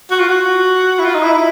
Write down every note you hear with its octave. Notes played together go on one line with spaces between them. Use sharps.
F#4
F4
F#4
E4
F4
D#4
E4
E4